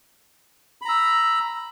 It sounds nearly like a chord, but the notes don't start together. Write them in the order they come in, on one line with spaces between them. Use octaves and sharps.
B5 A#5 E6